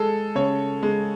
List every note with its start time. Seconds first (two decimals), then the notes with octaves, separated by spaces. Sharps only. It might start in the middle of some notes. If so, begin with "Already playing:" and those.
Already playing: G#3 A4
0.35 C#3 C#5
0.83 G#3